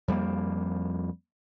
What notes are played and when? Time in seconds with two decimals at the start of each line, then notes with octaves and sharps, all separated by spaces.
0.08 F2 G3 A#3